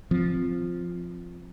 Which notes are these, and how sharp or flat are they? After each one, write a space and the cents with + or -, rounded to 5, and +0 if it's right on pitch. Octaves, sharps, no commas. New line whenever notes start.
F3 +0 C4 +0